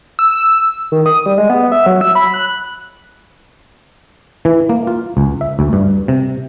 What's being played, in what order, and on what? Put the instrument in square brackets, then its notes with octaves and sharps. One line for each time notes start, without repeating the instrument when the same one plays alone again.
[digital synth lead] E6
[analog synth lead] D#3
D#6
G3
G#3
B3
E5
F#3
E6
B5
F#6
[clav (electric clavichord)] E3
A#3
F4
C#2
E5
D2
G2
C3